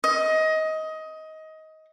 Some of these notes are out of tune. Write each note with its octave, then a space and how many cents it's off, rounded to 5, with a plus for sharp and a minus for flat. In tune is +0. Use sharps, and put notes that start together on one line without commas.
D#5 +20